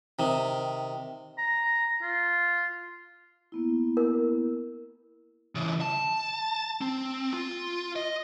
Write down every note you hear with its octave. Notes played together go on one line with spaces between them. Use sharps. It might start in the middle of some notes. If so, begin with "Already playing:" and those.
C3 D#3
A#5
F4
A#3 B3 E4
A#4
C#3 E3
A5
C4
F4
D#5